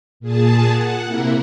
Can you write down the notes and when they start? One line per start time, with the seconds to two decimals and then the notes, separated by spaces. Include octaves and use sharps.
0.20 A#2 G#4 A5
0.71 F#5
1.05 C3 A#3 E4 A#4